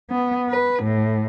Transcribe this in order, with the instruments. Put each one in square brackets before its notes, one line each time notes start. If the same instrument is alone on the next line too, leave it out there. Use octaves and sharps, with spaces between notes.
[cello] B3
B4
A2